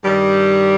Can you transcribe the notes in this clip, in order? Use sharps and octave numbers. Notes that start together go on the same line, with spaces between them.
G2 D#3 G3